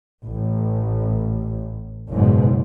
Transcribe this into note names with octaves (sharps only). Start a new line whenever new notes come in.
A1
F#1 G#2 B2